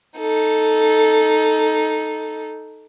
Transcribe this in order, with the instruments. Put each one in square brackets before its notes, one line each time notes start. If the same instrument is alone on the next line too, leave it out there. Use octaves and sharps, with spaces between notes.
[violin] D#4 A4